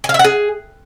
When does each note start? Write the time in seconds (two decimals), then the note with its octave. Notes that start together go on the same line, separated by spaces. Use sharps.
0.04 G#5
0.09 F5
0.14 E5
0.19 F#5
0.24 G#4